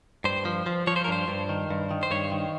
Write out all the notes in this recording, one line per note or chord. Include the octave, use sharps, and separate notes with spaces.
G2 C5
F3
F3
F3 C#5
C5
A#4
G2 C5
G2
D#3
G2
D#3
C5
G2 C#5
D#3